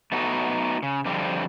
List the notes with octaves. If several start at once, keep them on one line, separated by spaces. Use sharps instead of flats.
A3 B3 D#4 F#4 A4
C#3
F2 D3 G3 C4